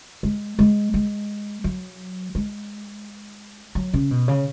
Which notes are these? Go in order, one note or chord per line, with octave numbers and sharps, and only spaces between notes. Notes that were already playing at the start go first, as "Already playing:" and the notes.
G#3
G#3
G#3
F#3
G#3
F#3
C#3
B2
C#3